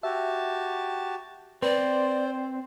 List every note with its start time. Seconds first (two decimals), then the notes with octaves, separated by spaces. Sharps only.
0.03 F#4 G4 E5 A5
1.62 C4 B4 C5 D5